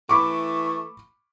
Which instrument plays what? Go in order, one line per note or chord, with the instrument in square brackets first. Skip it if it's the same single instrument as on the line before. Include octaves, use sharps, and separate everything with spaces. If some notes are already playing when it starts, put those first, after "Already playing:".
[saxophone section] E3 A3 [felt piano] B5 C#6 D6